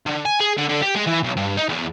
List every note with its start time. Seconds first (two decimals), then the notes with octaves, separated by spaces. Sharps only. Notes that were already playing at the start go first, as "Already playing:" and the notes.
0.06 D3
0.25 G#5
0.40 G#4
0.57 D3
0.69 D3
0.82 G4
0.95 G#3
1.06 E3
1.23 B1
1.37 G2
1.57 D#4
1.69 E2